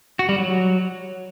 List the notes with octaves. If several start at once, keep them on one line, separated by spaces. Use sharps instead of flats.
F#4
G3
F#3